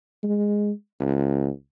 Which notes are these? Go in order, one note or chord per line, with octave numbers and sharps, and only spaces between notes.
G#3
C#2